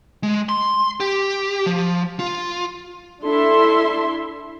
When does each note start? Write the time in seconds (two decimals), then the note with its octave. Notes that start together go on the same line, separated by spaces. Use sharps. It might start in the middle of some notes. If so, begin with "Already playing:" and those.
0.23 G#3
0.49 C6
1.00 G4
1.66 F3
2.19 F4
3.23 D4 E4 A4 E5 C6